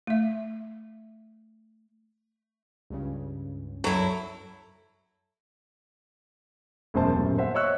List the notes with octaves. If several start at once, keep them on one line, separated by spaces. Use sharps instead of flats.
A3 E5
C#2 G2 C#3
F#2 F#3 E4 A4
E1 F#2 C5 A5
D#1 F#2
C5 E5 F#5
C#5 D#5 C#6 E6 F#6